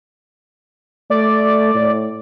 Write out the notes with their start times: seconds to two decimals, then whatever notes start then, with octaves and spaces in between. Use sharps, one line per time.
1.10 A3 D5
1.74 A2